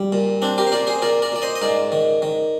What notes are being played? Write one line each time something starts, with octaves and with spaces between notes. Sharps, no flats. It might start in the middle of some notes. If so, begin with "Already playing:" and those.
Already playing: G3
A#2
C4 D4
G4 A#4
C5
A#2 A#4 D5
G#4 C5
A#2 A#4 D5
A#4 D5
A#2 D5
C5 D#5
D#5
G#2 A#4 D5
D#3
D#3